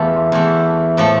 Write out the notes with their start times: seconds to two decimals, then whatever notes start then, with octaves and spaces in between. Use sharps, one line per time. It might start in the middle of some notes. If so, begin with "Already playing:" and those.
Already playing: E2 E3 A3 F4 G4
0.32 E2 E3 A3
0.97 A2 F3 A3